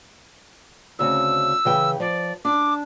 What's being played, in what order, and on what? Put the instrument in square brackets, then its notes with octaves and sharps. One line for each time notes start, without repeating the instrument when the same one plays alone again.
[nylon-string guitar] D2 C#3 C4 [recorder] E6
[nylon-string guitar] C#3 E3 G5
[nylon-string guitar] F3 [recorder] D5
[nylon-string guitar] D4 [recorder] D6